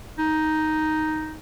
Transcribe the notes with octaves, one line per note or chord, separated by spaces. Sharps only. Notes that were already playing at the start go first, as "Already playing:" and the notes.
D#4